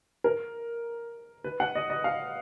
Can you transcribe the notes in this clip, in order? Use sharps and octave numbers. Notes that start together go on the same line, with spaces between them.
A#4
B4
F#5
D#5
D#5
F5